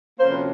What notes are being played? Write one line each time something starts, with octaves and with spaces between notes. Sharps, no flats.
D2 C3 F3 A#3 C#4 C5
B4